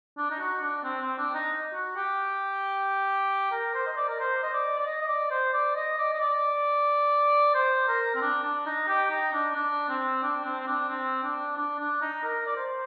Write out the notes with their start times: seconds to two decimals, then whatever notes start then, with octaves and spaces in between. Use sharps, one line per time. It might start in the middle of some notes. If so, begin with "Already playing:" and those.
0.17 D4
0.31 D#4
0.39 F#4
0.61 D4
0.84 C4
1.01 C4
1.18 D4
1.34 D#4
1.73 F#4
1.96 G4
3.52 A#4
3.74 C5
3.86 D#5
3.97 D5
4.09 A#4
4.20 C5
4.43 D#5
4.53 D5
4.78 D5
4.86 D#5
5.01 D#5
5.08 D5
5.31 C5
5.53 D5
5.75 D#5
5.98 D5
6.13 D#5
6.20 D5
7.54 C5
7.88 A#4
8.15 C4
8.21 D4
8.44 D4
8.66 D#4
8.88 G4
9.10 D#4
9.33 D4
9.55 D4
9.89 C4
10.23 D4
10.45 C4
10.60 C4
10.67 D4
10.89 C4
11.23 D4
11.57 D4
11.79 D4
12.01 D#4
12.23 A#4
12.46 D5
12.56 C5